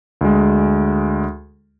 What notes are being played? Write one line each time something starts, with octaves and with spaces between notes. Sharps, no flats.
D2 G#3